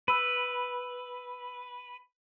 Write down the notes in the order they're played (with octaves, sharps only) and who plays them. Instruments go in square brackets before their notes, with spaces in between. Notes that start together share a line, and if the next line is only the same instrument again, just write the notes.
[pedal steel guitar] B4 [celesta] B5 E6